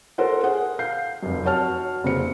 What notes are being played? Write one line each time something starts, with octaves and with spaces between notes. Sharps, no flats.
A4 A#4 C5 C#5 F#5
G#4 F#5
F5 G6 C7
F1 F#2
F#4 C#5 A5 F6
F1 C#3 A#3 C4 C#7